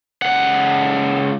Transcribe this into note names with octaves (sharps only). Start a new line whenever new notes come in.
C#2 F#5